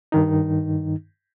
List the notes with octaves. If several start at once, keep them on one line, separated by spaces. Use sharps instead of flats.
G2 D#3 D#4